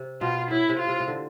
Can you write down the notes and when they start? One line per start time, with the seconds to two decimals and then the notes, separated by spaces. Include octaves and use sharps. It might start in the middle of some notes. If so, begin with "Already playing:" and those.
Already playing: C3
0.21 B2 F4
0.50 A2 E4
0.69 C3
0.79 F4
0.88 C3
1.00 C3
1.08 D3